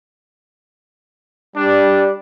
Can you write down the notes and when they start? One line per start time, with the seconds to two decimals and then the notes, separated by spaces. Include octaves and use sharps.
1.56 G3 D4